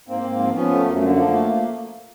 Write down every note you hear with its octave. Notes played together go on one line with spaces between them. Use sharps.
G#2 A#3 C4
G#2
F3
F3 B3 C#4
A3
F#2 A#3
A3
D3 A#3
F3 A#3
A3